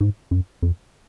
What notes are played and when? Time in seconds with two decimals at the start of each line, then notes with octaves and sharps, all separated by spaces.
0.01 G#2
0.31 F#2
0.62 F2